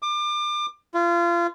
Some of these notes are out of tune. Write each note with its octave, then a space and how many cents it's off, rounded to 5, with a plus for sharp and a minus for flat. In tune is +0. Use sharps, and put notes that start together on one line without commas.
D6 +30
F4 -30